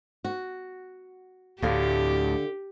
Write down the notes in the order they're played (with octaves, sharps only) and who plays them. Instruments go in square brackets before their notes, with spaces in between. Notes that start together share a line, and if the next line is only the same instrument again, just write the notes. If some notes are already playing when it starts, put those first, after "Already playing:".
[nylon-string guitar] F#4
[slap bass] D2 A2 [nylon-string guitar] D3 F5 [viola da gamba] G4